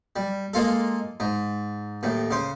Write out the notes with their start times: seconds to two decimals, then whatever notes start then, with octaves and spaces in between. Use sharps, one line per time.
0.16 G3
0.53 G#3 A#3 F4 A4
1.20 G#2
2.03 D#2 A2
2.31 C#3 C5